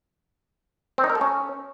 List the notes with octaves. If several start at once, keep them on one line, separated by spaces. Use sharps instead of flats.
C4
D#4
A#4
A4
C#4